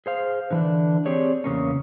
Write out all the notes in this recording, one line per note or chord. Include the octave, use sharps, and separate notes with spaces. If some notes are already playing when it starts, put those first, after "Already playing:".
G#4 C5 F5
D3 E3 D4
C4 G4 G#4 C#5 D5
E2 C#3 A#3 C#4